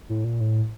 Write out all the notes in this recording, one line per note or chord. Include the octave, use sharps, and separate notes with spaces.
A2
A#2
A2